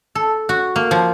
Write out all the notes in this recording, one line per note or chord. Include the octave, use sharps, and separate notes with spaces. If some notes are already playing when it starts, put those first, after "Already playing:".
A4
F#4
A#3
F3